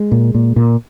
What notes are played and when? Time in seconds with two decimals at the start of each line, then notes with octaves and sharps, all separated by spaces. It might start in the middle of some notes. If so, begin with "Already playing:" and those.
Already playing: G#3
0.12 A#2
0.35 A#2
0.56 A#2